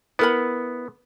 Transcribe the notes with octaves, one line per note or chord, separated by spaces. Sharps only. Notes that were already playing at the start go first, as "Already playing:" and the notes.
B3 E4 A#4 B5